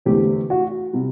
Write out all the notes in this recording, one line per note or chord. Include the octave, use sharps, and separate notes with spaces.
E2 D3 A3 C4 G4
F#4
C3 G3